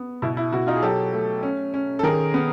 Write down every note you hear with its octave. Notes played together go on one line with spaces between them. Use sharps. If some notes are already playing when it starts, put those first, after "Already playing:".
Already playing: B3
B2 E4
E4
B2 E4 F#4
D#4 F4
G#4
F#3 G4 A4
A3
C#4
C#4
A4
D#3 G#4 A#4
B3